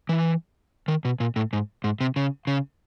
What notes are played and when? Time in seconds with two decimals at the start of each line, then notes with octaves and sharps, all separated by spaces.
0.09 E3
0.88 D#3
1.05 B2
1.20 A#2
1.36 A2
1.53 G#2
1.84 G#2
2.01 C3
2.16 C#3
2.47 C#3